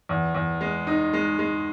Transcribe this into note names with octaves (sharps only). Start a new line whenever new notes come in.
E2
E2
G#3
D#4
G#3
G#3